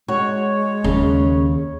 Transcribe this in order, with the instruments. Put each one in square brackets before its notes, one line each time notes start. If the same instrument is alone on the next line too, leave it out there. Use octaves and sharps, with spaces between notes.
[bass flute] G#3 [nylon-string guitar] F#4 [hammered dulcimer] C#5
[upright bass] D#2 A#3 [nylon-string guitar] C#3